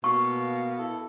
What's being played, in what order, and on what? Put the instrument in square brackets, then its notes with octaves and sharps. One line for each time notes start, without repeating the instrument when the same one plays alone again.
[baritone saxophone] B2 [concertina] A#3 F5 [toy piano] C#6
[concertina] E4 A4